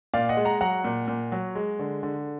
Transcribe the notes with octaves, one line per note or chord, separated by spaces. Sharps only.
A#2 D5 F5
D#5 F#5
G#3
F#5 A#5
F#3 F#5 A#5
A#2
A#2
F#3
G#3
D3
D3